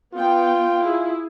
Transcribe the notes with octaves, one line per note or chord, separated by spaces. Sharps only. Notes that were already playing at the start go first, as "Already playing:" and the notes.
B3 F4 G5
E4 G#4